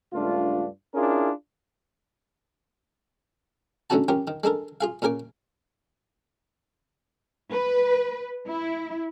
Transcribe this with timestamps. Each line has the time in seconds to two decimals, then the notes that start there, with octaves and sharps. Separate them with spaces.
0.13 C#2 G2 A3 D4 F4
0.95 C#4 D4 E4 F4 G#4 A#4
3.90 A2 D3 C#4 D#4 F#4 A5
4.08 C#4 F4 G4 A#4
4.28 D#3
4.44 G#3 D4 A4 A#4
4.81 F4 G#4 F5
5.02 A#2 C#3 A#4 G#5 D6
7.52 B4
8.47 E4